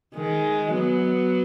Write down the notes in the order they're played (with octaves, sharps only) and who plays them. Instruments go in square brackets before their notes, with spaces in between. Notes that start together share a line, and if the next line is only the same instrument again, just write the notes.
[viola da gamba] D#3 G#3
F#3 B3